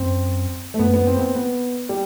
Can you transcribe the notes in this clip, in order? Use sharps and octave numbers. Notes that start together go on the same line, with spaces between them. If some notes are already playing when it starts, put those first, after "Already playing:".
Already playing: F#2 C4
A3
F#2 B3
B3
C4
B3
C4
B3
G3